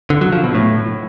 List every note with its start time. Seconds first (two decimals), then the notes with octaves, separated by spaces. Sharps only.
0.10 D3
0.21 F#3
0.32 F3
0.44 B2
0.55 A2